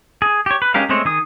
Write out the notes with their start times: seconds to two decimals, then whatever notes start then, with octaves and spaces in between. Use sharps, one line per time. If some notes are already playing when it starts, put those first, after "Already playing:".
0.22 G#4
0.46 G4 C#5
0.62 B4
0.74 G#3 C#4 G4 A#4 F5
0.89 G#3 A3 C4 C5 C#5
1.05 D#3 G#4 D#6